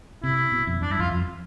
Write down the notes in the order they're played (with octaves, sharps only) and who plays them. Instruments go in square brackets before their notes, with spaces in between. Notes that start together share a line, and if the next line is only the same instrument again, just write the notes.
[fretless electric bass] C3 [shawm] E4
[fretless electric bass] B2
F2
[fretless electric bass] F2 [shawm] D4
[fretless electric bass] G2 [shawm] E4
[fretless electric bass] F2 [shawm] F4
[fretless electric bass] F2